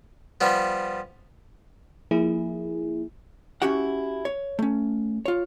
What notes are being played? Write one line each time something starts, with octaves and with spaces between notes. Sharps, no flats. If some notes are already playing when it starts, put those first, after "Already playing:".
F3 G3 B3
F3 A#3 E4 G#4
C#4 E4 F#4 G4 F#5
C#5
A3 C#4
F4 C#5